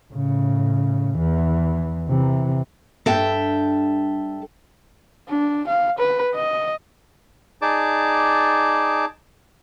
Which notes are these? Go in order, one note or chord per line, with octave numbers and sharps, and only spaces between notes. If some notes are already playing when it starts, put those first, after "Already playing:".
A2 C#3
E2 E3
C3 E3
G2 A4 E5 G5
D4
F5
B4
D#5
D#4 G#4 D5 A5 D6